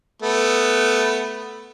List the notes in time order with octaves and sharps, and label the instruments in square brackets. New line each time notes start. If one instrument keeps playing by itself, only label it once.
[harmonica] A3 B3